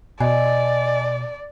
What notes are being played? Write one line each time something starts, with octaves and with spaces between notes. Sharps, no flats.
B2 D5 D#5 G#5